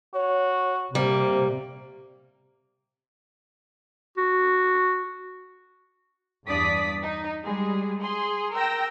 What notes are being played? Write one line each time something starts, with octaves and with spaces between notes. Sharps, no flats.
F#4 C#5
C3 G3 A#3 C5
F#4
E2 G2 D4 D5 D#6 B6
D#4
G3 G#3 G#4
G#4 C6
A#4 G5 E6 A#6